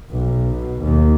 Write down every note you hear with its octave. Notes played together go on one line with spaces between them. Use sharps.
B1
B2
D#2